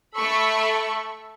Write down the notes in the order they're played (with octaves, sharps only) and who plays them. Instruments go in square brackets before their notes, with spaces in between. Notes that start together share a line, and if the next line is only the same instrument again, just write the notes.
[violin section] A3 B5 C#6 [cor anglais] A4